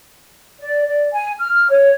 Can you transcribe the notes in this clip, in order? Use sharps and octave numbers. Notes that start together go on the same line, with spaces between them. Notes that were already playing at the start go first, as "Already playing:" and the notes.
D5
D5
G#5
F6
C#5